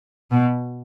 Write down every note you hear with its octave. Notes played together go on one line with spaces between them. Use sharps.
B2